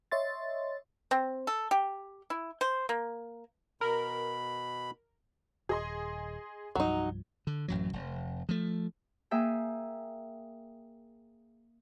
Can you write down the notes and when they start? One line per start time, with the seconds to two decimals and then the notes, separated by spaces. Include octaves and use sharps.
0.11 C#5 D#5 E5 C6 A6
1.11 C4
1.47 A4
1.71 G4
2.30 E4
2.61 C5
2.89 A#3
3.81 B2 A#4 B5
5.69 D#1 G#4 D#5 C6
6.75 C2 G2 F3 F#3 D#4
7.47 D3
7.68 A1 F#2 F#3
7.93 F1
8.49 F3 A3
9.31 A#3 G#4 E5 G5